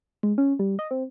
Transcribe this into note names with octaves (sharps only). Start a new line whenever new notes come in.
G#3
C#4
G3
D#5
C4